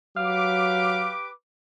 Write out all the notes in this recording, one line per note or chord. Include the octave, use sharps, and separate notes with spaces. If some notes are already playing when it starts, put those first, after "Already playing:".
F#3 G4 B4 F5 D6